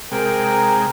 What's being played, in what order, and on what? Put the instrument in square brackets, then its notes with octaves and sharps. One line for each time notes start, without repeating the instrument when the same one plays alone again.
[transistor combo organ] C3 G#3 [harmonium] A#4 G5 [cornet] A#5